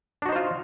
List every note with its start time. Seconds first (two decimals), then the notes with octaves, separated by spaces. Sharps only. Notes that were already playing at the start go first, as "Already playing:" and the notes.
0.22 D4
0.26 F#4
0.29 D#4
0.32 C5
0.36 F4